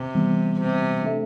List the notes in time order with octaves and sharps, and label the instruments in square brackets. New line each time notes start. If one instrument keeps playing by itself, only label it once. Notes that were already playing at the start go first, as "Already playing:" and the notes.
Already playing: [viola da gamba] C3
[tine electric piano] E3 G3 B3
[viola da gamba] C3
[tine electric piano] A3 D4 A4 E5